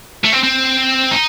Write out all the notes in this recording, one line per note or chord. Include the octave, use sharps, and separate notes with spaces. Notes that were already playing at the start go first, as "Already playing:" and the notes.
A3
C4
C4
D#4